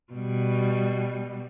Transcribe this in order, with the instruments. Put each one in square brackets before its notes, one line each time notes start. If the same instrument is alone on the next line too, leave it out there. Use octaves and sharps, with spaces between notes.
[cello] B2 G3